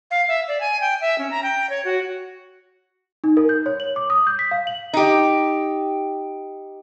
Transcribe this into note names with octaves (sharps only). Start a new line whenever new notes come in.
F5
E5
D5
G#5
G5
E5
C#4
A#5
G5
C#5
F#4
D#4
A#4
G6
C#5
F#7
D6
D#6
G6
B6
F5
F#7
D#4 G4